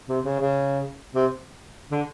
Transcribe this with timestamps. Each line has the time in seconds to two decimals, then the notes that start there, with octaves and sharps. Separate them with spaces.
0.08 C3
0.24 C#3
0.39 C#3
1.14 C3
1.91 D3